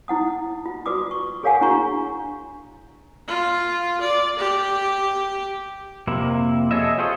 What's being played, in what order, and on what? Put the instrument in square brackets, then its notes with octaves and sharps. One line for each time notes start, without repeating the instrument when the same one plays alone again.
[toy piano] D#4 E4 F#5 D#6
F4
F4 F#4 B4 D5 D6 D#6
C#6
G#4 A#4 C#5 F5 F#5 G#5
D4 E4 F#4 A#5 C#6
[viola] F4
D5
G4
[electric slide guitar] F2 C3 A#3 E4
G#4 A4 C#5 D#5 E5
F4 G4 G#4 C5 C#5 D#5